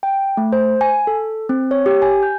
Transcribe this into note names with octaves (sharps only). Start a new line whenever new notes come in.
G5
A3
C5
G#5
A4
C4
C#5
G4
G#5
G6